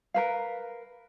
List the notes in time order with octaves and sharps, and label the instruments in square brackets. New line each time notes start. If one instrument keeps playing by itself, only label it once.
[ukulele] A#4 B4 F5